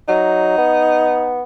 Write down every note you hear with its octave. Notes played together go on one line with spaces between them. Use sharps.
F#3 D#4
B3